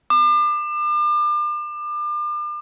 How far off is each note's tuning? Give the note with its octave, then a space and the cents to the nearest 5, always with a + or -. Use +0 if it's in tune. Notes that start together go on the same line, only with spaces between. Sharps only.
D6 +35